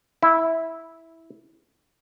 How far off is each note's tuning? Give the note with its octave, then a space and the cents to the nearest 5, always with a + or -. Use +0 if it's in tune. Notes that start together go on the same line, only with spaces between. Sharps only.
E4 -10